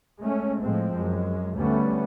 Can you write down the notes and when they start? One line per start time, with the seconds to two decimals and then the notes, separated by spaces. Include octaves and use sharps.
0.19 G#3 A3 C#4
0.61 A2 F3 G#3 C4
0.95 F#2 G#3
1.55 D2 G3 A3 B3 C#4